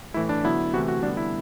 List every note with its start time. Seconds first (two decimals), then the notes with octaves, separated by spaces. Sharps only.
0.14 A2 E3 A3 E4
0.29 D4
0.44 D3 F#3 B3 E4
0.73 C3 E3 A3 F#4
0.88 F#4
1.03 D3 G3 B3 D4
1.17 E4